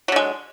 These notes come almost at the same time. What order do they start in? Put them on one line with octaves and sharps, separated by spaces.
F#3 D3 G#3